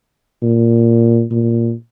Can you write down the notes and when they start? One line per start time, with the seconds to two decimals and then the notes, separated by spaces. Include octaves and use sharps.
0.42 A#2
1.31 A#2